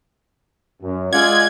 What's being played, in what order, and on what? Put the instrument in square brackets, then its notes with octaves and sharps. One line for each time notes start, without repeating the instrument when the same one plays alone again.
[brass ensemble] F#2
[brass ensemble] G#3 [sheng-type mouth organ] F4 D5 F#5 [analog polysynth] G#6